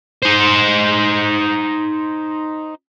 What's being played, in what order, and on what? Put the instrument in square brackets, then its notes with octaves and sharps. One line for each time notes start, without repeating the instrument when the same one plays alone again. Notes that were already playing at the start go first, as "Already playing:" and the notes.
[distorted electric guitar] D#4 C5